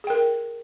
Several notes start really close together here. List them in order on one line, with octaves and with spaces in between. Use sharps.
G#4 G5 A#4